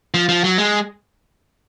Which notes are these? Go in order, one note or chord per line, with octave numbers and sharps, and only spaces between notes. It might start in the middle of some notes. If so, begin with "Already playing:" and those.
F3
F3
F#3
G#3